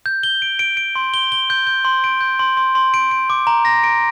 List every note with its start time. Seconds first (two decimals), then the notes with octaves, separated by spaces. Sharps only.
0.06 G6
0.23 G7
0.42 D7
0.59 D7
0.77 D7
0.96 C6
1.14 G7
1.32 G7
1.50 G6
1.67 G6
1.85 C6
2.04 D7
2.21 G6
2.39 C6
2.57 C6
2.75 C6
2.94 D7
3.11 D7
3.30 D6
3.47 A#5
3.65 A#6
3.84 D7